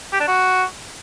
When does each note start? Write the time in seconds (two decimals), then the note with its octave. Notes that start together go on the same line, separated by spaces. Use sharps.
0.13 G4
0.20 D4
0.27 F#4